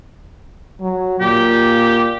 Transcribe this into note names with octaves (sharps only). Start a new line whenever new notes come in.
F#3
A#2 G4